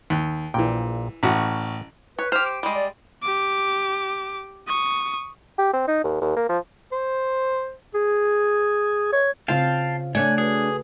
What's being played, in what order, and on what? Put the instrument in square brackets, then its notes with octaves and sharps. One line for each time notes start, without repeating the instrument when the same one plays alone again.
[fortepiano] D#2
[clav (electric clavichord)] A#1 A#2 [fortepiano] E3 G5
[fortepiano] A1 F#4 [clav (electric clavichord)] A2 D5
[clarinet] B4 [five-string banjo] C#5
[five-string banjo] G4 C5 [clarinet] F6
[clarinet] D6
[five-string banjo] G3 G#3
[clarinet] D5
[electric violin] G4 D6
C#6 D#6
[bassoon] G4
C4
D#4
D#2
D#2
A#3
F3
[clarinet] C5
G#4
C#5
[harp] C#3 [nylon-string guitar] C4 F4 [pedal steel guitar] F5 G5 A5
[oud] A3 [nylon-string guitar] D4 C#5 D5 [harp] F#5 F#6 [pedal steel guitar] G#5
[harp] F#4 B4 [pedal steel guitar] G#4